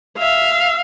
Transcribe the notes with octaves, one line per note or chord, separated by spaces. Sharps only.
E5 F5